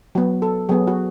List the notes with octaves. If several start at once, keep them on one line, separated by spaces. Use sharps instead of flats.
F#3 B3 F#4
A4
F#3 B3 G#4
F#4